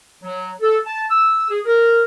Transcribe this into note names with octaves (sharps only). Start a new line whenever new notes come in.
F#3
A4
A5
E6
G#4
A#4